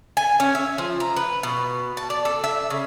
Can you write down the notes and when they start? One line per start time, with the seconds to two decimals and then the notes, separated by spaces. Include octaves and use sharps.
0.17 G#5
0.40 C#4
0.55 E5
0.78 F3
1.00 A#5
1.16 B4
1.43 B2
1.97 A5
2.10 D5
2.25 A4
2.44 E5
2.70 C#3